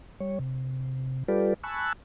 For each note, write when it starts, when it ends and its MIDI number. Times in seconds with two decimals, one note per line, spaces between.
0.20 0.39 55
0.20 0.39 73
0.39 1.23 48
1.28 1.54 55
1.28 1.54 65
1.28 1.54 67
1.28 1.54 69
1.28 1.54 71
1.28 1.54 74
1.63 1.93 80
1.63 1.93 81
1.63 1.93 83
1.63 1.93 85
1.63 1.93 88
1.63 1.93 90